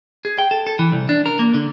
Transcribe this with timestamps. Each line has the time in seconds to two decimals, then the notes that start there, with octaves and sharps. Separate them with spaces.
0.25 G#4
0.39 G5
0.51 A4
0.67 A4
0.79 E3
0.92 C2
1.09 D4
1.26 A#4
1.39 A#3
1.54 D3